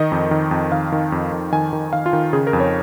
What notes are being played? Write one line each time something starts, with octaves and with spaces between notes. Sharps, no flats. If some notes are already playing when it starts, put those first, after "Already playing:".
Already playing: D#3 D#5
F2
D#3
F2
D#3 F5
D#3
F2
F2
D#3 G#5
D#3
D#3 F5
F4
D#3
C#3 G#4
A#4
F2
C#5